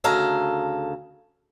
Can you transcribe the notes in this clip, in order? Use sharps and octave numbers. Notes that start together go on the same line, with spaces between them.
D2 C#3 A4 F5 A#5